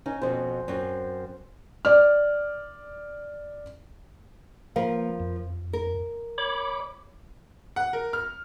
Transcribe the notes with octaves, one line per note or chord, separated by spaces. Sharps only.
C#4 D#4
F2 B2 C5
F#2 C4
D5 F6
F3 A#3 A#4 B4
F2
A#4
C#5 B5 D6
F#5
A#4
F6